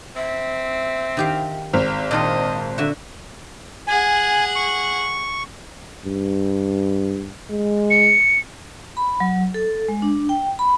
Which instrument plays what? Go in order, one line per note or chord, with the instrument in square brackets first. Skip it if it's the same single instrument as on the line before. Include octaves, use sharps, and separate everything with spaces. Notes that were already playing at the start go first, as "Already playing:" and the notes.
[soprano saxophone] C4 [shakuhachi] E5
[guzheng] D#3 G4 F5
[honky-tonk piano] G#1 C4 F6
[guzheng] A#2 D#3 F4 [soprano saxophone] D#5 [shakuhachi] A5
[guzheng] D3 F#4 [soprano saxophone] E5
[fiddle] G#4 F#5 [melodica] G#5
[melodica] C#6
[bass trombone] G2
G#3
[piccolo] C#7
[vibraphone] B5
F#3
A4
G#3
D4
G5
B5